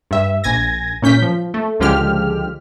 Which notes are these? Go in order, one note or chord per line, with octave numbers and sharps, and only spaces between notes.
G2 E5
A#1 G#5 G#6 A#6
A#2 C#4 G6 B6
F3
A3
C#2 D3 F3 G#3 G4 F6